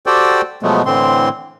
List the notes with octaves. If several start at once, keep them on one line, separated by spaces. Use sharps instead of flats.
F#4 G4 A4 C5 D5 G5
B2 F3 F#3 G#3 A3 B3
A2 D3 E3 C4 C6